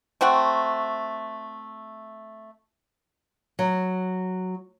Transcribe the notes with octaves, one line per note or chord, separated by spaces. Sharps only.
A3 C4 F#4 F#5
F#3